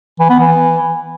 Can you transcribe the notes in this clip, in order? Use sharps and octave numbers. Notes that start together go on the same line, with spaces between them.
E3
B3
E3